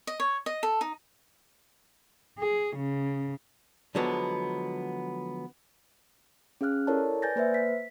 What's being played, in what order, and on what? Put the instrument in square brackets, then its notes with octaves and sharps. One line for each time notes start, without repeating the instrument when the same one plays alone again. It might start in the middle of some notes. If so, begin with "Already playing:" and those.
[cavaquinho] D#5
C#5
D#5
A4
D#4
[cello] G#4
C#3
[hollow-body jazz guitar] D3 F3 F#3 G#3 B3
[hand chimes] C#4 G#4 F5 F6 F#6
E4 A4 A#4 C#5 D5 A5
B4 D5 G#5 G6 A6 A#6
A#3 B4 C5 E5
B6